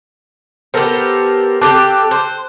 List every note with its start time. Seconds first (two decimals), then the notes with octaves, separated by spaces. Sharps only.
0.74 B3 G4 A4 A#4 C5
1.61 C4 G4 A4 A5 D6 F#6
2.11 C5